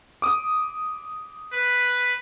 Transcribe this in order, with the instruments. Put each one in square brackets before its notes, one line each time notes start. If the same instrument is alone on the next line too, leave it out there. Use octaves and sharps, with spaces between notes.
[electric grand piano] D6 D#6
[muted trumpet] B4